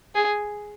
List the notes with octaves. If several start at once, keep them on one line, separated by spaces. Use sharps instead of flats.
G#4